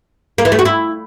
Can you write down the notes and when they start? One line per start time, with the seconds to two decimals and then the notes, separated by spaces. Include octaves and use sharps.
0.38 A#3
0.45 E3
0.52 A3
0.59 F#4
0.65 E4